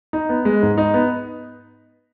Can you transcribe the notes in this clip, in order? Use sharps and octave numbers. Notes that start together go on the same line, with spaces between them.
D#4
B3
G#3
G#2
D#4
B3